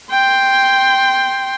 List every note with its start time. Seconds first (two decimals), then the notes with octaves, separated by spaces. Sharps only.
0.10 G5 C6